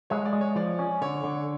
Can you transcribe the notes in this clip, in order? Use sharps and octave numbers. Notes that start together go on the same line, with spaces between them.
G#3 C#5
D5
G#3
C#5
F3 D5
C#4
D3 C#5
D3